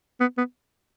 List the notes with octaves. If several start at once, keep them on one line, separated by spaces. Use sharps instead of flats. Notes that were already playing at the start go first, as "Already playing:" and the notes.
B3
B3